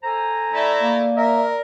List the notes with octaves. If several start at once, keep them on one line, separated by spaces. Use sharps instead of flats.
A4 C5 G#5 A#5
A3 E4 D5
A#3
A#4 E5